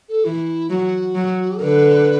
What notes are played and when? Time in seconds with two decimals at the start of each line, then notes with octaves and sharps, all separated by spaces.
0.09 A4
0.25 E3 E4
0.70 F#3 F#4
1.15 F#3
1.61 D3 B4